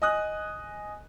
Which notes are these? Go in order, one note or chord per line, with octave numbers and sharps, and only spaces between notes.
D#5 G#5 D#6 F#6